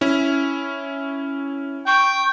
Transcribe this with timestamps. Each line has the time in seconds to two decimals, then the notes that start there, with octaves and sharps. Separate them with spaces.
0.01 C#4 E4
1.87 G5 C#6